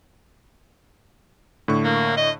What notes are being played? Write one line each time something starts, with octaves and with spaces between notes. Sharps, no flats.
A2 D3 C#6
A#3
D#5